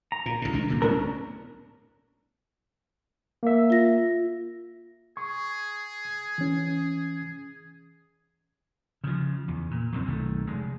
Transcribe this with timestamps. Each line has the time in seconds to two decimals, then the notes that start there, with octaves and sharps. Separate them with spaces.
0.12 A#5
0.26 A#2
0.42 C#2 A2
0.53 C2 D#3 D4
0.68 F#1 A#2 D3
0.82 C2 A2 B3 C#4 D4 A#4
3.43 A#3 E5
3.70 F4 A#6
5.17 G#4 C#6
6.38 E3 C#4
9.04 C#3 F3
9.48 E2
9.71 A#2
9.92 F#2 C3 D#3 C4
10.06 B1 D#3 A3
10.47 F1 G#3